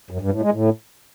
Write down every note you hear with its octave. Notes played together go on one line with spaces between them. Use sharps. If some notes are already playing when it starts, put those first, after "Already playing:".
F#2
G2
A2
G#3
A2